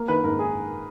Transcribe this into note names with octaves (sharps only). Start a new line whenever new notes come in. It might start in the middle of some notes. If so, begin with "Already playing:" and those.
Already playing: A#3
D#3 B4
G#2 A#4
G#4